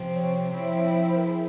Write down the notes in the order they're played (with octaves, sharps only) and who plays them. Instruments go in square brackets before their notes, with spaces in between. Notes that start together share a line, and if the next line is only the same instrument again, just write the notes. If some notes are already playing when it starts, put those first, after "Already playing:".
Already playing: [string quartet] C3 F3 C4
[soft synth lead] C#5
[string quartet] F3 C4 E4
[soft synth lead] C5
A#4
G#4